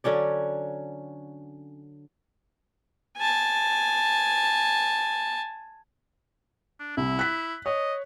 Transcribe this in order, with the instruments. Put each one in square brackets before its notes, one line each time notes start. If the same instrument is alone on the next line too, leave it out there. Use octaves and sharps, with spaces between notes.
[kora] D3 F#3 C#4 D5
[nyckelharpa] G#5 A5
[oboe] D4
[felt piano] C2 [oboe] E4
[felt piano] F#6 B6
[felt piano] C#5 [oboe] D#5